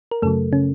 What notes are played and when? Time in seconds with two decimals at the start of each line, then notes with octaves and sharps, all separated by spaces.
0.11 A#4
0.22 F#2 C#3 F#3 A3 A4
0.53 C#3 C#4